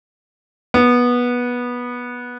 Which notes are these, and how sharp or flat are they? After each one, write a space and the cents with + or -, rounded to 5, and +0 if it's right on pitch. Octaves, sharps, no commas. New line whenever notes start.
B3 -15